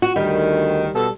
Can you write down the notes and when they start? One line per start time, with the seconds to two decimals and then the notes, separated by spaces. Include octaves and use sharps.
0.02 F#4
0.16 D2 D#3 G3
0.95 B2 A4